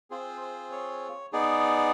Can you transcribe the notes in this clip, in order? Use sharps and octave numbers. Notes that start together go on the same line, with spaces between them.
C4 F4 G#4 C5
C5
C#5
B3 D#4 G#4 D5